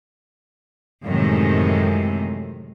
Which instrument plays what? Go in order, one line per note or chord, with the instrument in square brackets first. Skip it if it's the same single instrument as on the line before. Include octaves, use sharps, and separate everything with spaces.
[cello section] F#2 A2 C3 D#3 E3 G#3